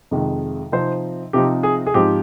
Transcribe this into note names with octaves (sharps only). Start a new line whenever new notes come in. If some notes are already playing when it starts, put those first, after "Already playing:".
F2 C3 D#3 G#3
C3 F3 C4 D#4 C5
C3 F3 C4 D#4 G4
G#4
G#4
G#2 F3 C4 D#4 G4